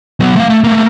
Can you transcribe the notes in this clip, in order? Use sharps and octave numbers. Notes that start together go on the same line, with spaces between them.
F#3 B3
A3 F5
A3
A3 A#3